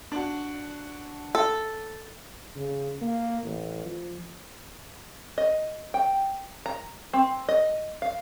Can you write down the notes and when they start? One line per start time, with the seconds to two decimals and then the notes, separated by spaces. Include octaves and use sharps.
0.12 D4 F#4
1.35 A4
2.56 C#3
3.01 A#3
3.44 A1
3.85 F3
5.38 D#5
5.94 G5
6.66 A#5
7.13 C4
7.49 D#5
8.02 F5